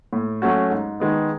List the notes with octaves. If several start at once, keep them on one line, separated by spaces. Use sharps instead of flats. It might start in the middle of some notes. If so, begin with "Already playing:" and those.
A2
F#3 A3 C#4 F#4
G#2
D#3 G#3 B3